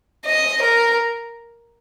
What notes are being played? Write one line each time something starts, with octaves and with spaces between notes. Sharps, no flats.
D#5
A#4